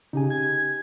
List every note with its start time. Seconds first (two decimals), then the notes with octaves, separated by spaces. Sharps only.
0.13 C#3 D#4 G4 G#5
0.30 G#6